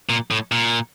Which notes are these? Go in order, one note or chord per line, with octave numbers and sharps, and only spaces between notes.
A#2
A2
A#2